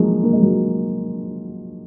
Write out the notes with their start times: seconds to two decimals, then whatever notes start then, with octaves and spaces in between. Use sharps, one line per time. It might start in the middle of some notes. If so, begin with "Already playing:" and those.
Already playing: F3 F#3 G#3 A#3
0.23 A#3
0.33 G#3
0.42 F#3 A#3